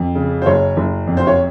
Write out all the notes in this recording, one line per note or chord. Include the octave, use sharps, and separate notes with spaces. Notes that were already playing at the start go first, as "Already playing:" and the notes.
Already playing: F2
C#3
C5
F#1 C#5
F#1
F2
C5
C#5